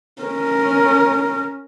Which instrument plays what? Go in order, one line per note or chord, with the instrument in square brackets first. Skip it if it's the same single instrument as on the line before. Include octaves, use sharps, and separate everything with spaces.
[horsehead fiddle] C#4 A#4